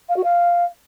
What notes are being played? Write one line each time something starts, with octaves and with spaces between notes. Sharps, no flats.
F5
F#4
F5